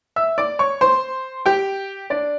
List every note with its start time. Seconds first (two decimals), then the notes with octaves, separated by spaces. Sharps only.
0.16 E5 E6
0.38 D5 D6
0.59 C#5 C#6
0.81 C5 C6
1.46 G4 G5
2.10 D4 D5